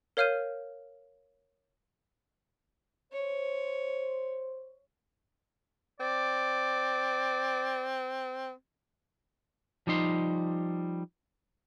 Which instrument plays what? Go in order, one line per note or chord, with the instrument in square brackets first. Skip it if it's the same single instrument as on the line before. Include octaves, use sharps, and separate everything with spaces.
[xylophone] A#4 C#5 F5 F6 G6 D#7
[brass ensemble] C5 [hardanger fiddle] C#5
[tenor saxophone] C4 [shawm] D5
[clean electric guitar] F3 G3 D#4 C6